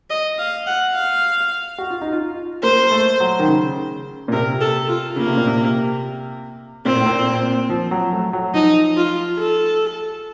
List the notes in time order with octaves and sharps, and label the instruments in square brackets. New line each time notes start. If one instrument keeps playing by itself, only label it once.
[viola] D#5
F5
F#5
F5
[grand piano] F#4
F4
D#4
F4
[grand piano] A#3 [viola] C5
[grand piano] A3
F#3
D#3
C#3
A#2
[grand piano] C3 [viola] A#4
[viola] A4
F4
[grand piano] C#3 [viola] A#3
[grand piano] C3
A#2
C3
[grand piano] A#2 [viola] C4
[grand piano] A2
A#2
F3
F#3
A3
F#3
[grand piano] F3 [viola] D#4
[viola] F4
A4